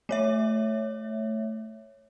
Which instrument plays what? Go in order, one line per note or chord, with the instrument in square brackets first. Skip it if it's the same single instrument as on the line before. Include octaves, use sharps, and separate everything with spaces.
[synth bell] A3 C#5 E5